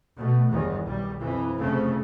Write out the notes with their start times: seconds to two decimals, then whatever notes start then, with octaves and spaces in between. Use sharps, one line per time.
0.15 B2 A3
0.49 G1 E2 G2 D#3 E3
0.81 B1 G3
1.20 F2 E3
1.59 F1 F2 C#3 A3